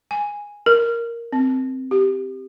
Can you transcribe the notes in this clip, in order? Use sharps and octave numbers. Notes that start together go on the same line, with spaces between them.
G#5
A#4
C4
G4